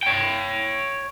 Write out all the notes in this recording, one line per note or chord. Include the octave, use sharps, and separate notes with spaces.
C#5 G5